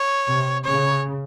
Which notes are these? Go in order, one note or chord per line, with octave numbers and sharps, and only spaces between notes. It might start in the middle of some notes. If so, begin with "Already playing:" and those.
Already playing: C#5
C3
C#3 C#5